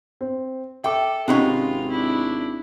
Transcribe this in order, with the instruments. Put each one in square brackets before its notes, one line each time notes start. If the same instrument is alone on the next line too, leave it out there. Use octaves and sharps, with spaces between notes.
[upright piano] C4
[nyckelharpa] A4 [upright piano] E5 D6 [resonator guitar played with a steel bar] G5
[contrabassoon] G#1 [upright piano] C3 D#4 [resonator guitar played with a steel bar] G#3 B3 C#4 [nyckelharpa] F4
[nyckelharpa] D4 E4